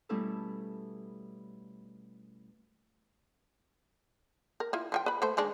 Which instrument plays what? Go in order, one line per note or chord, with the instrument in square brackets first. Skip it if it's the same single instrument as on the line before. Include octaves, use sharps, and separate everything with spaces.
[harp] B2 G3 A3 C#4 E4 A4
[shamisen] A#4
E4 F4
F3 F4 G5
B4 B5
A3 A4 C5
D#3 G#3 D4